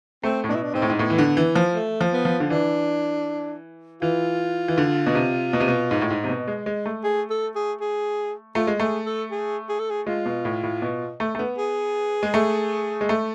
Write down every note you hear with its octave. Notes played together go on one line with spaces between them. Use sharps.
A3 C4
A2
B2 D4
E4
D4
G#2 C4
A2
G#2
A2 B3
E3
D3
E3
F3
A3
F3
B3
F3
D3
E3 D4
E3 F4
E3
D3
B2
C3
B2
C3
B2
G#2
A2
G#2
C3
B2
G#3
G#3
A3
G#4
A4
G#4
G#4
A3 F4
G#3
A3 G#4
A4
G#4
G#4
A4
G#4
G#3 F4
B2
A2
A2
B2
A3
A3
B3
G#4
G#3
A3
G#3
A3